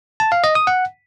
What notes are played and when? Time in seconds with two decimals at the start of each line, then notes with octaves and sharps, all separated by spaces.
0.20 A5
0.32 F5
0.44 D#5
0.55 D#6
0.67 F#5